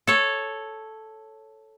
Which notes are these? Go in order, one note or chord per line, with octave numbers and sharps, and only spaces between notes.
A4 C#5